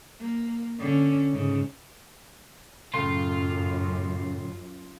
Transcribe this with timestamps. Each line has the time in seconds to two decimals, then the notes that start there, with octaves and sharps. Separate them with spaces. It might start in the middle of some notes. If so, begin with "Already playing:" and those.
0.20 A#3
0.79 D3 C#4
1.32 G#2 C#3
2.94 F#2 A2 C#3 F4 C6